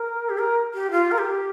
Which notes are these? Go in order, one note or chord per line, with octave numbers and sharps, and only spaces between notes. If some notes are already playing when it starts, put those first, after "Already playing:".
Already playing: A#4
G4
A#4
G4
F4
A#4
G4